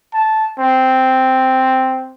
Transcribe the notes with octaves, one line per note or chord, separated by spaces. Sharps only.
A5
C4